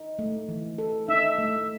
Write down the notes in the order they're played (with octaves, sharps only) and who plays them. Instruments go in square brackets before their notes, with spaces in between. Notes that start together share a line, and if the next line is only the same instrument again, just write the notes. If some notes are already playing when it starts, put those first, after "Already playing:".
Already playing: [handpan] D#4
A3
E3
A4
[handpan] D#4 [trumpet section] E5
[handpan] A3